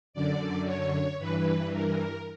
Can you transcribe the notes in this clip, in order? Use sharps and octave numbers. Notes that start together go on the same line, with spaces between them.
F#2 D3 D5
C#5
G2 E3 B4
A#4